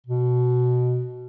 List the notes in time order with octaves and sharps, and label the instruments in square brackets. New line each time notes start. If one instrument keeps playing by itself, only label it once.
[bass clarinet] B2